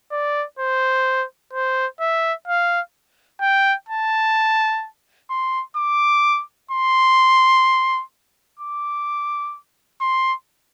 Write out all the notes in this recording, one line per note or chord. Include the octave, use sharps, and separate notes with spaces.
D5
C5
C5
E5
F5
G5
A5
C6
D6
C6
D6
C6